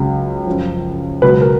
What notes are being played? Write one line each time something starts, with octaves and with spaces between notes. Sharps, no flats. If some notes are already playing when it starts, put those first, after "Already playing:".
Already playing: C#2 C#3 F#3
F#2 F3
C#2 B2 F#3 B4
A#4